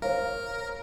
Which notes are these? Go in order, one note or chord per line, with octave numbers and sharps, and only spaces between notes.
A#4 C5 C#5 F5